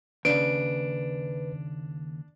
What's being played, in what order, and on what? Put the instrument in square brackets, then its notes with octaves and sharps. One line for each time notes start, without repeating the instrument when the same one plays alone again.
[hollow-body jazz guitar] D#2 C#3 [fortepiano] D4 [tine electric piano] B4 [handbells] D7